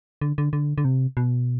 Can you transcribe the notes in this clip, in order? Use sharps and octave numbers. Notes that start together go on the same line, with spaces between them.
D3
D3
D3
D3
C3
B2